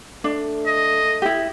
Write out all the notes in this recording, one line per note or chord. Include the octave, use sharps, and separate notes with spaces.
A3 D4
D#5
E4 G4